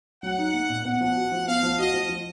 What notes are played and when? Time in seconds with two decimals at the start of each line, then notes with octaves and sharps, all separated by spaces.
0.23 F#3 F#5
0.38 D#4
0.53 A#3
0.69 A#2
0.85 B3 F#5
1.01 F3
1.16 F#4
1.32 F3
1.47 B3 F5
1.63 F3
1.78 F#4 D#5
1.94 F3
2.09 F3